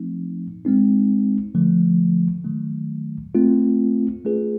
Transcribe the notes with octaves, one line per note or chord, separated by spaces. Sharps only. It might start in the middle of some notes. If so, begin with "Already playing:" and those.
Already playing: F3 A3 C4 D#4
G#3 C4 D#4
D3 F3 A3
D#3 F#3 A3
A3 C4 F4
A3 C#4 F4 G#4 B4